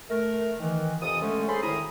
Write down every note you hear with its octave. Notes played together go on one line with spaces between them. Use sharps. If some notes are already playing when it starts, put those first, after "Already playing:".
A3 A#4
D#3 E3
F2 C3 E3 A4 D#6
D3 G#3 A3 C#4
C#4 G#4 A4 C5 B5 C6
D2 A2 D#3 E4 A#5 D#6